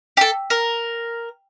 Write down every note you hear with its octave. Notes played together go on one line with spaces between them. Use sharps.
G4
A4
A#4